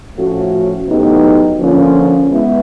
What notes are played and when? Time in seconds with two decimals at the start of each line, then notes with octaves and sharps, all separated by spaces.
0.15 A2 F3 A3 C#4 F#4
0.86 A2 F#3 B3 D#4 G4
1.58 D3 F3 A#3 C#4 F4
2.29 G#3 B3 E4